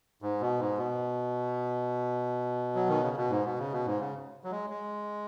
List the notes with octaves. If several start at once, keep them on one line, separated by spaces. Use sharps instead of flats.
G#2
B2
G#2
B2
F#3
D#3
C#3
B2
G#2
B2
C#3
B2
G#2
C#3
F#3
G#3
G#3